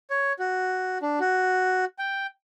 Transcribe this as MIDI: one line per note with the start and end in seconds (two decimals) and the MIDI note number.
0.10 0.33 73
0.39 0.98 66
1.02 1.19 62
1.20 1.85 66
1.98 2.27 79